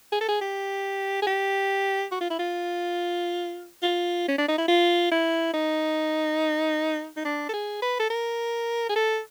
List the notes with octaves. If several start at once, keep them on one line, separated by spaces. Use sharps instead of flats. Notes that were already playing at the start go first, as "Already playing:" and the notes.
G#4
A4
G#4
G4
G#4
G4
F#4
F4
E4
F4
F4
C#4
D4
D#4
E4
F4
E4
D#4
D#4
D4
A4
G#4
B4
A4
A#4
G#4
A4